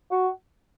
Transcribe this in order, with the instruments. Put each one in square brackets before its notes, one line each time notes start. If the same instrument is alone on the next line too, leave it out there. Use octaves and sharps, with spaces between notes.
[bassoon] F#4